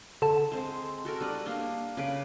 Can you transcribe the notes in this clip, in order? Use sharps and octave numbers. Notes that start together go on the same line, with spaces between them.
D3 A5
G#3 C4
F#4 A4 A#4
G3 D4 B4
A#3 D4 D#5
C#3 B4 D6